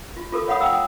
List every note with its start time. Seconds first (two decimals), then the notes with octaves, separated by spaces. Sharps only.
0.17 F4
0.32 F4 A4 A#4 D6
0.48 C#5 F5 F#5 B5 D#6
0.61 F#5 G5 A#5 D#6 E6